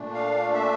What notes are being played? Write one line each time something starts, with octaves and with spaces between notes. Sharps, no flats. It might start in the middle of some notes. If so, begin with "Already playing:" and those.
Already playing: A#2 A3 D4
F5
E5